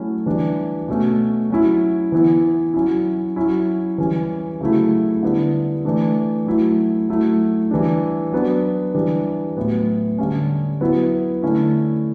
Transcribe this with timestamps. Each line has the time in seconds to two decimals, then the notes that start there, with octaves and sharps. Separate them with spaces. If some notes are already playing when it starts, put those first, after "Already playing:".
Already playing: F#3 A3 C#4 E4
0.26 E3 G3 D4
0.88 B2 A3 C#4
1.50 F#3 C#4 E4
2.12 E3 B3 E4
2.74 F#3 C#4 E4
3.36 F#3 C#4 E4
3.98 E3 G3 C#4
4.61 C#3 F#3 A3 E4
5.23 D3 G3 B3 E4
5.85 E3 A3 D4
6.46 F#3 A3 E4
7.09 F#3 A3 E4
7.71 E3 G3 D4
8.32 F#3 B3 D4
8.94 E3 G3 D4
9.57 A2 F#3 B3
10.18 D3 G3 C#4
10.80 F#3 B3 E4
11.43 D3 A3 C#4 E4